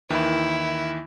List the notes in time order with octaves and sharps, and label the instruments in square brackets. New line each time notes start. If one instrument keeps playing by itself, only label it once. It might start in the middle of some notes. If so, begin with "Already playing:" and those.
[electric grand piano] D#2 D#3 E3 [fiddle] E4